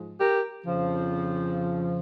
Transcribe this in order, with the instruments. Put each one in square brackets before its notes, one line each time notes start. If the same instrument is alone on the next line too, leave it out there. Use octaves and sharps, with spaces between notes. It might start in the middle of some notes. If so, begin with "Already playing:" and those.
Already playing: [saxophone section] G#2 F3 G#3
G4 A#4
F2 C#3 F3